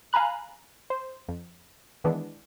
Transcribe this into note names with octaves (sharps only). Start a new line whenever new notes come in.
F5 G#5 A#5 B5 F#6
C5
F2
D#3 E3 G#3 B3 D4